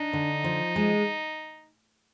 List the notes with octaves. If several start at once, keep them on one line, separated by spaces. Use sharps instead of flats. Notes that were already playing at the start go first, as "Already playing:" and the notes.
Already playing: D4 D#4
D3
F3
G#3